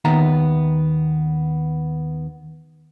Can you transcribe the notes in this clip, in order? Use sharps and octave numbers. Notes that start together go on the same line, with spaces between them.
D#2 D#3 B3 E5 A#5